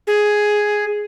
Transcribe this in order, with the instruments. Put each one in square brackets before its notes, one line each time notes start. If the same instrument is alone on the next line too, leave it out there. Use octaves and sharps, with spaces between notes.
[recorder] G#4